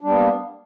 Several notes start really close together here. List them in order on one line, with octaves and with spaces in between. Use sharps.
D4 G3 B3 A#3